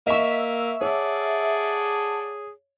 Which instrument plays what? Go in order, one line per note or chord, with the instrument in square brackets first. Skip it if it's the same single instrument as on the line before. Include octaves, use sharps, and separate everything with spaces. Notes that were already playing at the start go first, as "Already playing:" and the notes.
[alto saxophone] A#3 [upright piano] D#5 C#6 [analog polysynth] E5
[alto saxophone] G#4 [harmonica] A4 D5 F#5 [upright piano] C#5